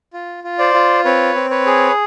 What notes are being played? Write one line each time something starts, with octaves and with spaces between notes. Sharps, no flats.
F4
F4
C5 D5
F4
C4 B4 C#5
C4
B4 C#5
G#4